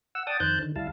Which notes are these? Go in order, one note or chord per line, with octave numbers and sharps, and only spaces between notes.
F#5 E6
D5 F#5 G5 A5 D#6
F2 D#3 C5 A5 F#6 G6
D3 D#3
D2 G3 E4 F5 A5